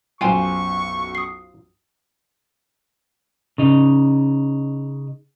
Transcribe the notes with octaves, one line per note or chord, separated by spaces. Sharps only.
B1 F#2 F4 C5 G5 G#5 C6 C#6
D#6 C7
C#3 D#4